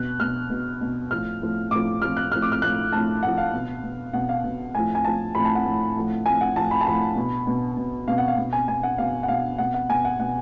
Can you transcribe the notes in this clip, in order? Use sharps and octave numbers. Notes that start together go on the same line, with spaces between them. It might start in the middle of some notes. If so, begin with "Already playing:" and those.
Already playing: B2 F#6
B2 F6
B2
B2
A2 F3 F6
A2 F3
A2 F3 D6
A2 F3 F6
F#6
A2 F3 F6
D6
F6
A2 F3 F#6
A2 F3 A5
A2 F3 F#5
F5
B2
B2
B2 F#5
F5
B2
A2 F3 G#5
G#5
A2 F3 A5
A2 F3 B5
A5
F#5
A2 F3
A2 F3
A2 F3 G#5
F#5
A2 F3 A5
B5
A5
A2 F3 B5
B2
B2
B2
B2 F5
F#5
F5
B2
G#5
B2 G#5
F#5
B2 F5
F#5
B2 F5
B2 F#5
F#5
B2 G#5
F#5
B2 F#5